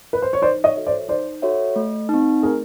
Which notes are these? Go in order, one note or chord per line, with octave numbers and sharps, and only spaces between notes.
B4
C5
C#5
D#4 C5 D5
C#5 D#5
F#4 A4 C#5 E5
C5 D5
D#4 C5 D5
F#4 A4 C#5 E5
A3
C4 D#4
A3 G#4 A#4